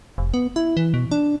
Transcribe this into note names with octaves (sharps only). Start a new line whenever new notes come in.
F1
B3
E4
E3
B2
D4